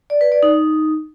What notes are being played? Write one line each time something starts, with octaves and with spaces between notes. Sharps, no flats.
D5
B4
D5
D#4